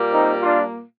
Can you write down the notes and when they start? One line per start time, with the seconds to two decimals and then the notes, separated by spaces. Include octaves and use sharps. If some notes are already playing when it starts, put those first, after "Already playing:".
Already playing: A#2 G3 A#3
0.13 C4 D#4
0.42 D4 F4